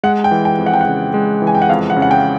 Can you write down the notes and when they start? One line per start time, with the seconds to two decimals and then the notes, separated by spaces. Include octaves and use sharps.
0.03 G#3 F#5
0.24 G5
0.31 E3
0.45 G5
0.58 F2
0.66 F#5
0.73 G5
0.81 F#5
0.87 C#3
1.14 G#3
1.42 E3
1.47 G#5
1.55 G5
1.62 F#5
1.69 F2 F5
1.90 F#5
1.96 C#3
2.02 F#5
2.11 G5